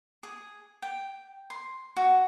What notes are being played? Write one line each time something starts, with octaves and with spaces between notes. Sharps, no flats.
G#4
G5
C6
F#4